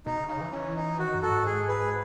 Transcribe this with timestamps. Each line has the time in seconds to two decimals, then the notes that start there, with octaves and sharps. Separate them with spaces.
0.06 B2 D#4
0.17 C#3
0.29 C#3 D#4
0.41 E3
0.52 E3 C#4
0.76 D#4
0.99 D#3 F#4
1.15 F#2
1.22 F#4 A4
1.30 G#2
1.46 G#4
1.68 G#4 B4